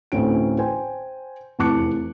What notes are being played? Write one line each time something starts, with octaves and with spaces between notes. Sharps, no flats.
A1 D2 C4 C#4 A4 D7
C5 G5 G#5
F1 E2 A5 D6 F#6 C#7